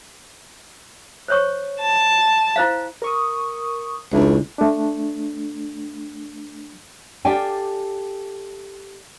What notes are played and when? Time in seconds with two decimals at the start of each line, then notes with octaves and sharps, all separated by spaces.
1.28 C5 C#5 C#6
1.81 A5
2.56 E4 C5 F5
3.02 A#4 C#6 D#6
4.13 C#2 A3 D4 E4
4.58 A3 D4
7.25 G4 A4 D5 F5 G5 G#5